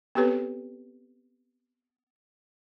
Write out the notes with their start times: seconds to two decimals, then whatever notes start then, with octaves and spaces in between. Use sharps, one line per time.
0.15 B3 C4 G4 A4 B4 C#5